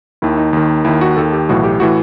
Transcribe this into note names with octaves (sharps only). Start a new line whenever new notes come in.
D#2 D#3 E4
D#4
D#2 D#3
D#2 D#3 E4
F#4
D#2 D#3 A4
G4
B1 A2 E3 F#4
G4
A2 E3 F#4